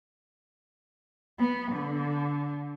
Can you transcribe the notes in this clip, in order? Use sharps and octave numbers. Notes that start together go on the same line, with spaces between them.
B3
D3